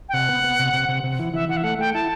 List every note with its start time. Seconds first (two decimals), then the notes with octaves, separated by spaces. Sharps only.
0.09 G5
0.14 C3 F#5
0.29 B3
0.44 B3
0.59 C3
0.74 C3
0.89 C3
1.04 C3
1.19 E3
1.34 E3 E5
1.49 E3 F#5
1.57 E5
1.64 A3 F#5
1.79 A3 G5
1.94 E4 A5